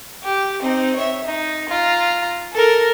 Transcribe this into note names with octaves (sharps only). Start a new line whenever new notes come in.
G4
C4 D#4
C#5 E5
D#4
F4 A#5
A4 A#4